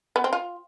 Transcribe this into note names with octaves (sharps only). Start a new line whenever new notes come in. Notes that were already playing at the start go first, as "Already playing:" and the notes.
B3
C4
F4